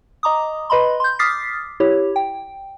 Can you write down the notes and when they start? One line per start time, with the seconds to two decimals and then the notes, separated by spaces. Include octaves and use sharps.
0.23 D#5 A#5 D6 D#6
0.70 B4 D#5 B5 C6
1.00 C6 G6
1.19 D6 D#6 F6 A6 B6 C7
1.80 E4 G4 C#5
2.16 G5